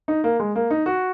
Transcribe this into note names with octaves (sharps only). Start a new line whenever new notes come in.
D#4
A#3
G#3
A#3
D#4
F#4